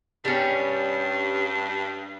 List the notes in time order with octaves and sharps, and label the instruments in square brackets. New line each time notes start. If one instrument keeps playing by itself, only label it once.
[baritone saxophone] G2 [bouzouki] G3 C#4